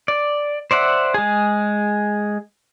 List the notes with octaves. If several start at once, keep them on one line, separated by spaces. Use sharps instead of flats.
D5
C5 D5 E5 F#5
G#3 G#4